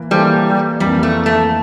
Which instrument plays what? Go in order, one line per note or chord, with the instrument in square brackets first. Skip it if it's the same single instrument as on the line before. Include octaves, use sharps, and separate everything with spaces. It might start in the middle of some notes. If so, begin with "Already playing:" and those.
Already playing: [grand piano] E3 A#3 E4
[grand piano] E3 A#3 E4 A4 C5 [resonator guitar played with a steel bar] G3
[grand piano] F2 E3 A#3 [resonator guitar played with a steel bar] G3
[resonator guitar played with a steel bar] A3
A3